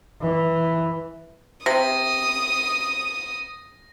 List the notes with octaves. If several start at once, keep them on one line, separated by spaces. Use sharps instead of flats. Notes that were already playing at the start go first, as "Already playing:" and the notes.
E3
C3 D#6 A#6